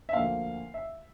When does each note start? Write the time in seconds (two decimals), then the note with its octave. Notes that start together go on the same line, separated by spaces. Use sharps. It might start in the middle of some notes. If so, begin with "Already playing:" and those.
0.09 E5
0.13 D2 D3 F3 A#3 F5
0.74 E5